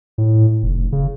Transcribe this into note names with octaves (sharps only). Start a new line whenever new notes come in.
A2
F1
C#3